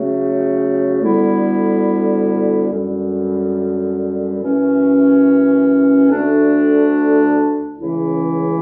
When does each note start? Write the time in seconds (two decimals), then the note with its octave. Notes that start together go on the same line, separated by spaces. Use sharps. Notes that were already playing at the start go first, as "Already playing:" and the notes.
Already playing: C#3 F#3 A3
1.01 D2 D3 G3 B3 E4
2.70 F#2 D3 G3
4.40 F#2 E3 A3 C#4
6.09 D2 D3 A3 D4
7.78 C#2 C#3 E3 A3 E4